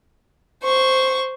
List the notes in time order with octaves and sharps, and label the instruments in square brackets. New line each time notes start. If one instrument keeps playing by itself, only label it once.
[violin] C5 C#6